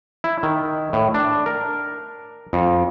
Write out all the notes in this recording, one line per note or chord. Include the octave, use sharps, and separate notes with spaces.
E4
D#3
A2
D4
A#4
F2